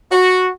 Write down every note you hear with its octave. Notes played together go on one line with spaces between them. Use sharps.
F#4